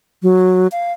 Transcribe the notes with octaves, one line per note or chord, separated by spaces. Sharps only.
F#3
F5